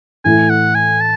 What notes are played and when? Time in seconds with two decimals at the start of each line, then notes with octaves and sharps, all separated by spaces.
0.24 A2 E3 A3 E4 G#5
0.50 F#5
0.75 G#5
1.01 A5